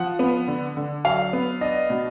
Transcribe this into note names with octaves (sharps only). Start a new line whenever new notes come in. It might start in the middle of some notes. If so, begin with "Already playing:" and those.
Already playing: F3 F#5
B3
D3
D3
F#3 F5
B3
D4 D#5
B2